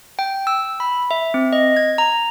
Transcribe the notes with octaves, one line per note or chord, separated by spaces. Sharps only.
G5
E6
B5
E5
C4
D#5
G#6
A#5